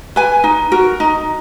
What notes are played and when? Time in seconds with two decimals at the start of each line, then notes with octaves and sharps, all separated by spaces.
0.16 B4 G#5
0.44 D#4
0.72 F#4 A#4
1.00 D#4